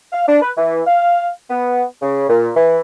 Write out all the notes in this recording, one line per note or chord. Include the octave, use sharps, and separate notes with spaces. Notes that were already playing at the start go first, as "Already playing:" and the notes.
F5
D4
B4
E3
F5
B3
C#3
A#2
E3